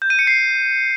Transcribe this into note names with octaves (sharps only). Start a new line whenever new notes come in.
G6
D#7
C#7
C7